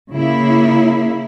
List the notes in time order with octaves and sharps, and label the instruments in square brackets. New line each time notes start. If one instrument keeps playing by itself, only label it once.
[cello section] C#3 A#3 E4